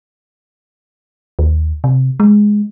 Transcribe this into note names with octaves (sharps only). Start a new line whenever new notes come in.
D#2
C3
G#3